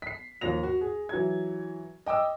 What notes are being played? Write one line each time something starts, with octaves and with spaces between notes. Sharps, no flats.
B6 C7
D#2 F3 A#6 F7
F#4
G#4
E3 F#3 G#6
D#5 G5 D6 E6